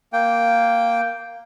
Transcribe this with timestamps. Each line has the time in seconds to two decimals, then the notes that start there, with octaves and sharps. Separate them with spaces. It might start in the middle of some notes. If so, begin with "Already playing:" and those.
0.13 A#3 G5